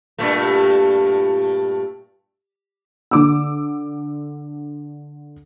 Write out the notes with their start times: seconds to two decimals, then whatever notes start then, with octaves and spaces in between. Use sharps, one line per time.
0.18 G2 A#2 A3
3.11 D3 D6 E6